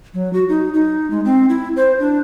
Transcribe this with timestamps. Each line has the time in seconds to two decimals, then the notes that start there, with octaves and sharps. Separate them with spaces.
0.14 F#3
0.33 F#4
0.49 D#4
0.73 D#4
1.10 G#3
1.25 C4
1.49 E4
1.76 C5
1.99 D4